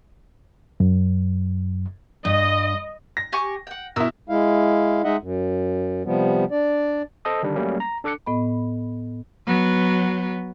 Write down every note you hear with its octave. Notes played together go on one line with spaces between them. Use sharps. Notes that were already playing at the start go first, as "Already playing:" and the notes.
F#2
G2 D#5
A#6
G4 G#5 C#6
F#5 G5
B2 E4 A#4 E6
G#3 E4 F5
G#3 D#4 D#5 E5 F#5
F#2
C3 F3 G3 B3
D4 D5
A4 C5 D#5 A5 D#6
D3 D#3 G3 D4
F#3 G3 A3 A#3 C#4
A#5
D4 A4 D6 F#6 C#7
A2 B3 D#5 B5
F#3 B3